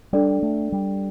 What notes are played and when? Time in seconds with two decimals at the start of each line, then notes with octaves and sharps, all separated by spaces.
0.13 G3 D4 A4 D5 G5
0.42 A3
0.72 G3